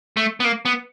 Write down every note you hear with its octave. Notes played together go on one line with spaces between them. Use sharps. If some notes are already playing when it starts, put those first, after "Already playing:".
A3
B3
A#3
B3